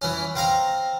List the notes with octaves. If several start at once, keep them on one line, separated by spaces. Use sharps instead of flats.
E3 C#4
C4 F5 A#5